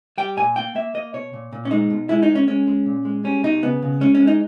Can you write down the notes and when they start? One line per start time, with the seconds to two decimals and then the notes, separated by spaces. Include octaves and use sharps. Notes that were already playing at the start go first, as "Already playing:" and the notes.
0.18 G3 G5
0.37 A#2 G#5
0.56 A#3 G5
0.75 A#3 E5
0.94 A#3 D#5
1.14 B2 C#5
1.33 A#2
1.53 A#2
1.65 C#4
1.71 G#3 D#4
1.90 B2
2.09 G#3 E4
2.23 D#4
2.29 G#3
2.35 C#4
2.48 G#3 C#4
2.67 G#3
2.86 A#2
3.05 G#3
3.24 G3 C#4
3.43 B2 D#4
3.62 C#3 B3
3.82 C#3
4.01 G#3 C#4
4.15 C#4
4.20 G#3
4.27 D#4